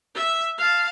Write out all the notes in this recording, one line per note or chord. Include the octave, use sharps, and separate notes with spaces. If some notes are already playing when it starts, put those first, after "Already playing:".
E5
F5 A5